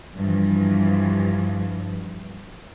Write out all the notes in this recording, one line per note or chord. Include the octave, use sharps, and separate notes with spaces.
G2 E3 F3